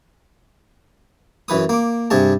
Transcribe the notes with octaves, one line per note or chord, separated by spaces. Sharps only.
F#2 E3 B4 D#6
A#3 D6
G2 C3 G#4 A5